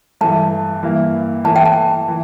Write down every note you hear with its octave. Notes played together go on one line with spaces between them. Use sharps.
G2 E3 A3 A5
G2 E3 A#3 E4
E3 A3 E4 A5
G5
A5
E3